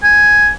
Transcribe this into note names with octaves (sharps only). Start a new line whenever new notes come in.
G#5